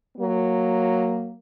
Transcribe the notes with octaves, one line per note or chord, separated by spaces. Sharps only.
F#3 A#3